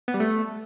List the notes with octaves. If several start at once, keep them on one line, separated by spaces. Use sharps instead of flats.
B3
G3
A3